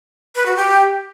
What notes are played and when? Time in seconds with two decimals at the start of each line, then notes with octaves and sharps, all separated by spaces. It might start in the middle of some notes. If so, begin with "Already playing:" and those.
0.35 B4
0.46 F#4
0.56 G4